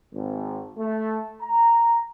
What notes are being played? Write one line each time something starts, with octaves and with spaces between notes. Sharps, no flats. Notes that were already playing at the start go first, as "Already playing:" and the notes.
G#1
A3
A#5